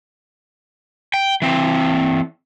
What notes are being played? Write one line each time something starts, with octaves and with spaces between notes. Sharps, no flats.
G5
E3 C4